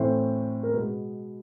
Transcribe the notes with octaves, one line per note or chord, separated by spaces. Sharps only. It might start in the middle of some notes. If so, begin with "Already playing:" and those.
Already playing: A2 E3 A3 C4 C5
A#4
B2 G#3 B3 B4